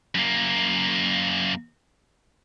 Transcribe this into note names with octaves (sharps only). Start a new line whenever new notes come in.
F#2 A#3